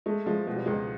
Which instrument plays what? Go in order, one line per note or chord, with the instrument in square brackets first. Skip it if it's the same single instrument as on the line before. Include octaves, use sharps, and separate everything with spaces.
[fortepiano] G#3 [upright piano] A3
[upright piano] F3 [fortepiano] G#3
[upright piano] B2 [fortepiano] G#3
[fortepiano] G3
[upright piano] C#2 [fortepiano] G#3